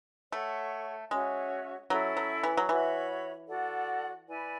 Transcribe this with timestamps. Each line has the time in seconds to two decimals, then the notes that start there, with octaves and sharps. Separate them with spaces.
0.32 A3 A4 C#5 F#5 C#6
1.11 G#3 C#4 F#4 C#5 E5
1.90 F#3 C#4 E4 A4 E5
2.17 F#3
2.43 E3
2.57 F#3
2.69 E3 F#4 C#5 E5 B5
3.48 F#4 A4 D5 F#5
4.27 E4 B4 D5 G#5